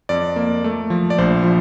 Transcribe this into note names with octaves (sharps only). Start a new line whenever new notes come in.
F2 D5
A#3
A3
F3
D5
A#1 C5
F3